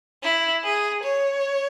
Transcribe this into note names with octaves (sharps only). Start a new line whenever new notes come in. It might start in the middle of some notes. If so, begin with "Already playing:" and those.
E4
G#4
C#5